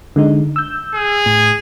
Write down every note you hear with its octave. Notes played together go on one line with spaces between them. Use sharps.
D3 G#3 D#4
E6 G6
G#4
A2